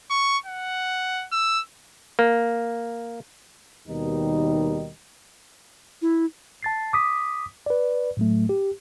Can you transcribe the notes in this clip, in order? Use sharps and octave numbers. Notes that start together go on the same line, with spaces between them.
C#6
F#5
E6
A#3
D#2 B2 D#3 G3 D#4
E4
A5 A6 C7
D6 D#6 B6
B4 D5
A2 F#3 A3
G4